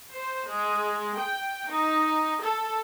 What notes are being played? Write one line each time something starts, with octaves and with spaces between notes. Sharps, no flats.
C5
G#3
G5
D#4
A4